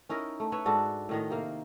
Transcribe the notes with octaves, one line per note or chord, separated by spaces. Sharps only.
C#4 D#4 E4 A#4
A3
B4 C#5 E5
G#2 D4 F#4 A4
A2 D#3 D#4
C3 A#3 F5